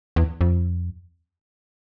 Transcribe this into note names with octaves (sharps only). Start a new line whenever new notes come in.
E2
F2